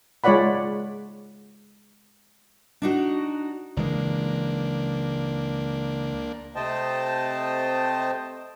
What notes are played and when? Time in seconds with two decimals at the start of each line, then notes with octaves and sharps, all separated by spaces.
0.24 G#3 F4 C#5 D5 F#5 B5
2.82 D4 D#4 F#4
3.77 C#2 E3 G#3 A#3 D4
6.56 C3 A3 C5 D#5 G5 A5